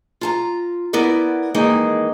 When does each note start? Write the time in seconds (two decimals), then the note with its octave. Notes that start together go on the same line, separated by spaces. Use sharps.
0.21 F4 A5 A#5
0.93 B3 E4 A#4 D5
1.54 D#3 E3 G#3 A#3 D#4